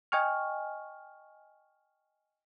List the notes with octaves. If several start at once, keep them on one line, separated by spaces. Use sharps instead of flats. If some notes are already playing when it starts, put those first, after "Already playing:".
D#5 G5 G#5 C#6 F6